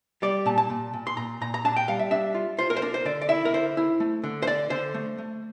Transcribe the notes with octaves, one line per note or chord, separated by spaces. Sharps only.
G3 D5
A#2 A5
A5
A#2
A#2
C6
A#2 A#5
A#2 A#5
A#5
D4 A5
G5
G3 F5
E5
D4 E5
F4
F4 C5
A#4
C5
D4 A#4
C5
D3 D5
D5
E4 E5
A#4
D3 C5
E4
A3
D3
C5
D3 D5
D3 C5
A3
A3